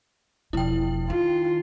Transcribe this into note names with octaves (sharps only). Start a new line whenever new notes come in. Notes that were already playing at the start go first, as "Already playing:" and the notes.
E1 F3 E4 G5
D#3 F4